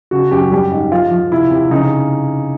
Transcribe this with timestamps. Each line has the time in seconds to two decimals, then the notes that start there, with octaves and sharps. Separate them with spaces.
0.11 C#3 F#4
0.31 F#2 G4
0.51 G3 G4
0.71 G#2
0.92 F3 F4
1.11 F3
1.32 C3 E4
1.51 C3
1.71 C#3 D#4